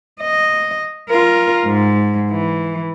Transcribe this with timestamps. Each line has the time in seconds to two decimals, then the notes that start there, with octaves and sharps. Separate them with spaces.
0.22 D#5
1.09 F4 A#4
1.65 G#2
2.31 E3